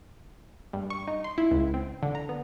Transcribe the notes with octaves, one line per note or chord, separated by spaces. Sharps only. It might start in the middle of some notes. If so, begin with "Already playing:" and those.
G2
C#6
D#4
C6
E4
C#2
C4
D3
A#5
B3